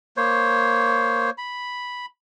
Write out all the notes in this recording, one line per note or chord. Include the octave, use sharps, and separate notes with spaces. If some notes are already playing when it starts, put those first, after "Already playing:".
A#3 C5 C#5
B5